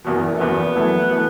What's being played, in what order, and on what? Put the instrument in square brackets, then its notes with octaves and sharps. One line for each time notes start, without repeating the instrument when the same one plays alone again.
[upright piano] F#1 E2 B2 [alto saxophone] E3
[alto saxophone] A3
[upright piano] F#1 E2 B2 [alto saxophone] B3
[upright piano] F#2 E3 A3 E4
E3 A3